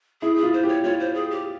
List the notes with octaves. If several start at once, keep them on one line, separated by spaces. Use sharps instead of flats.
E4 G#4
G#4
F4
C5
G4
C#5
F4 C#5
C5
G#4
G4